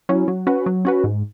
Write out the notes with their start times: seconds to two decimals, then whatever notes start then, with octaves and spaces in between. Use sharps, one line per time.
0.09 F#3 C#4 E4
0.28 F#3
0.47 C#4 F#4 B4
0.66 F#3
0.85 C#4 F#4 B4
1.04 G#2